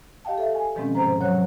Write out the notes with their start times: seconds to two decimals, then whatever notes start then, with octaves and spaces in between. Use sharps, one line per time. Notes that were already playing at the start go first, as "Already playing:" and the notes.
0.25 G4 D#5 F5 G5 A5
0.38 A4 E5
0.55 G#5
0.75 B2 D#3 F3 G#3 C4 C#4
0.95 G#2 C3 F3 G#3 C5 A#5
1.21 F#3 C#5 F#6